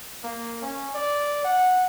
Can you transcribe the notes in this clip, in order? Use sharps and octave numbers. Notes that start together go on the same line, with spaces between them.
A#3
C#4
D5
F#5